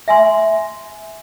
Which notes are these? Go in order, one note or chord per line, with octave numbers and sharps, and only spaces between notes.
E5 G#5 C6